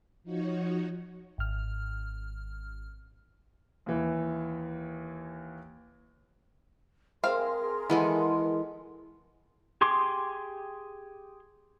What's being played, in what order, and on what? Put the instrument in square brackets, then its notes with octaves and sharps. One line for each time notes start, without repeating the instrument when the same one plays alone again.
[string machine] F3 D#4 F#4 C#5
[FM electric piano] G#1 F6
[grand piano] D#2 E3
[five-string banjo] C4 F5 [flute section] G#4 A#4 C6
[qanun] E3 G#3 A4 [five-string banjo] B3 F#5
[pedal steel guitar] G4 G#4 C6 D6